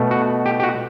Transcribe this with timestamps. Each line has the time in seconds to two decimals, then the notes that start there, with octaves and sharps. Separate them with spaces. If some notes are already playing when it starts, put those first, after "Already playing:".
Already playing: B2 A3
0.11 F#4
0.46 G4
0.60 G4
0.63 F#4